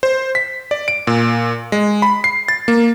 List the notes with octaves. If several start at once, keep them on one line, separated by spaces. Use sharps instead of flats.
C5
B6
D5
D7
A#2
G#3
B5
C7
A6
A#3